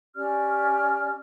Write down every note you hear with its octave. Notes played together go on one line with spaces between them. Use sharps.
C#4 G4 D5 F6